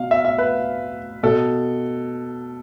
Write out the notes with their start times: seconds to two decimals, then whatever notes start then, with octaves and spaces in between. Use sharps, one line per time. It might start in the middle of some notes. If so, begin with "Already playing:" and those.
Already playing: B2 F5
0.11 E5
0.25 E5
0.38 B4
1.23 B2 A4